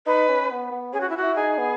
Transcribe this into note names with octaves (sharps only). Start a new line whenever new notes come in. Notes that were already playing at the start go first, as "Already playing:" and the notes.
D#4 B4
C#4
B3
B3
C#4 G#4
F#4
E4
F#4
E4
D#4 G#4
B3